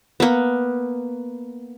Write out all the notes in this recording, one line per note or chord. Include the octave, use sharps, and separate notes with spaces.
A#3 B3